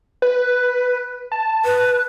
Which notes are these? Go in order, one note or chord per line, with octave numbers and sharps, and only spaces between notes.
B4
A5
B4